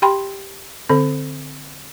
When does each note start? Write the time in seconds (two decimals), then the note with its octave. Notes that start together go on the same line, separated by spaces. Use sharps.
0.02 G4 G5 B5 C6
0.89 D3 C4 A4